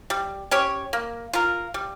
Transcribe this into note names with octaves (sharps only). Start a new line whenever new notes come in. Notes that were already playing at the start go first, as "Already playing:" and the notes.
G3
C#4 G4 C#5
A#3
F4 A#4
G3